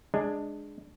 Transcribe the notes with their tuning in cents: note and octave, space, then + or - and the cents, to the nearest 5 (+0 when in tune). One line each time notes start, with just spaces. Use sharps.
G#3 +0 D4 +10